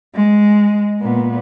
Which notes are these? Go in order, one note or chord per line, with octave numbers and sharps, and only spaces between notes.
G#3
A#2 B3